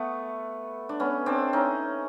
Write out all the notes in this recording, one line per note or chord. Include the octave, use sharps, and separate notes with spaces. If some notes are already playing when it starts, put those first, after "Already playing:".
Already playing: A3 B3
D4
B3 C#4
C4 D4
C#4 D#4